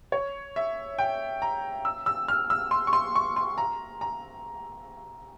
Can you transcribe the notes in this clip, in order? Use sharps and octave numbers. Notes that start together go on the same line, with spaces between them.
C#5
E5
G5
A#5
E6
E6
F6
E6
C6
C#6
C6
C#6
C6
A#5
A#5